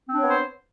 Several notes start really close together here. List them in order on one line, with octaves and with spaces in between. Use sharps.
C4 D4 C#5 B3 C5